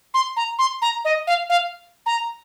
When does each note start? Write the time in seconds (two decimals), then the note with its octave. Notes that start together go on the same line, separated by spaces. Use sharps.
0.14 C6
0.37 A#5
0.59 C6
0.82 A#5
1.05 D#5
1.27 F5
1.50 F5
2.06 A#5